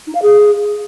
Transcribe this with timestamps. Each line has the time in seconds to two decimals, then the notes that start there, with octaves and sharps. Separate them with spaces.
0.07 D#4
0.15 F5
0.22 G#4